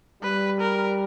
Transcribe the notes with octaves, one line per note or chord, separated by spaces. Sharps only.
G3 B4
A#4